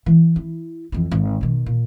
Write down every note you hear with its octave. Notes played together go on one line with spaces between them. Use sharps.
E3
E4
F2 E3
G#1
B2 D#3
A#2